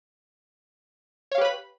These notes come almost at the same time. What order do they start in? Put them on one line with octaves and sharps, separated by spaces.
C#5 F5 G4 B4 B5